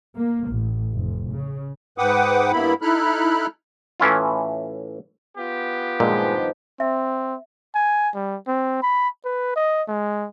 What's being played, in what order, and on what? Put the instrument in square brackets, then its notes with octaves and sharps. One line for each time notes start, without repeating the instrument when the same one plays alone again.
[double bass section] A#3
A1
F1
C#3
[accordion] G#2 B4 F#5 G5 D6 D#6
G2 A#3 B3 E4 B5
D#4 E4 A4 B5 F6 F#6
[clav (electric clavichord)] A2 E3 C#4 E4 F4
[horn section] B3 F4 G4
[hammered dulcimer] G2 D#3 F3 [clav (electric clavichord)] A#2 [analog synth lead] G#3
[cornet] C4 [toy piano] E5
[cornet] G#5
G3
C4
B5
B4
D#5
G#3